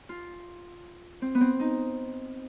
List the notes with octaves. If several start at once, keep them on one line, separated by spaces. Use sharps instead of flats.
F4
C4
B3
C4
D#4